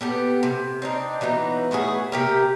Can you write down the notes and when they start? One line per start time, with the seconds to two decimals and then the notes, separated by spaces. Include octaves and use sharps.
0.01 B3 G4 A4
0.43 C3
0.82 C4 D4 D#4
1.21 E3 F#3 B3 D#4
1.71 A3 B3 F#4 G#4
2.12 C3 G4 A#4